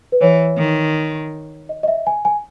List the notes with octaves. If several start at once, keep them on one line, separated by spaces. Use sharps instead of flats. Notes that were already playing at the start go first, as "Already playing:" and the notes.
B4
E3 C#5
D#3
D#5
D#5
E5
G#5
G#5